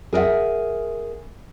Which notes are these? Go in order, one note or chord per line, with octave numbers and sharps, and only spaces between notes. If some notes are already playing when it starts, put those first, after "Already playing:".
G#4 A#4 C#5 E5 F#5